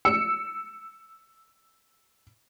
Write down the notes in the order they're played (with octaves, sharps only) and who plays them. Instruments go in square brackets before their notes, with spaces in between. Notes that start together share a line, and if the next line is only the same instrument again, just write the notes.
[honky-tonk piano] E6 C#7